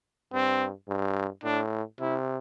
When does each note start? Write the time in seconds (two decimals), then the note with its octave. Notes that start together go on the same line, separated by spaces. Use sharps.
0.33 G2 C4
0.89 G2
1.44 A2 D4
2.00 C3 E4